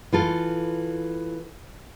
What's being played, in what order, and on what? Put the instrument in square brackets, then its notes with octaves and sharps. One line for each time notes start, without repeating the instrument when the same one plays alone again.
[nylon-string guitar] E3 F4 A4